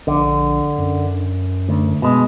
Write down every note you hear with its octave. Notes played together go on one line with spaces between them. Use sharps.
A#1 D3
F#2
D2
B2 G#3